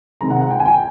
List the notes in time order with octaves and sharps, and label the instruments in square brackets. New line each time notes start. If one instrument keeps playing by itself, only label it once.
[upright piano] C3 D#3 G#3 C4 A#5
F#5
F#5
G5
G#5
G5